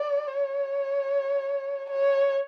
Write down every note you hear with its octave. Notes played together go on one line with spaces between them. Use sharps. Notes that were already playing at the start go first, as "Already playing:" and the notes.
Already playing: D5
C#5
C#5